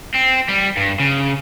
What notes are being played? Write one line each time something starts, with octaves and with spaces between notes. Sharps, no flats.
C4
G3
G2
C#3